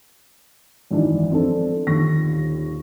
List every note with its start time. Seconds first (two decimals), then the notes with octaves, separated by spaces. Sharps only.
0.91 G#1 F#2 E3 D4 D#4
1.30 F3 C4 D4 A4
1.87 D#1 D#2 D3 C#6 A#6